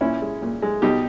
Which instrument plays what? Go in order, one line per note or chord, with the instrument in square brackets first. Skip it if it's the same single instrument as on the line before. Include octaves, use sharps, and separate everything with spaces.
[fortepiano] A#2 C#4 E4
G#3
A#2
G#3
B2 D#4 G4